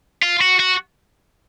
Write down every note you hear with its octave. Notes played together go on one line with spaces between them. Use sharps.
F4
F#4
F#4